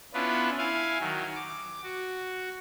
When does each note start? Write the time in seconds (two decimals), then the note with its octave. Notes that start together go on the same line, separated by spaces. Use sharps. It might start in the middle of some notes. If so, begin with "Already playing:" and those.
0.14 B3 C#4 D4 E4 F4 B4
0.58 E4 F5 G#5
1.00 D#3 F#3
1.36 D6
1.83 F#4